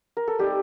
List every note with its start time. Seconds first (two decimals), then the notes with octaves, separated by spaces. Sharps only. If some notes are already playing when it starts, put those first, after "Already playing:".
0.17 A#4
0.28 A4
0.39 G3 C4 D#4 G4